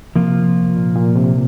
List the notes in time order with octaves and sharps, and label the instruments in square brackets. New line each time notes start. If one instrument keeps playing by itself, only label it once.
[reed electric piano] C3 [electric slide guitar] F3 A#3 F4
[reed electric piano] A#2
A#2
C3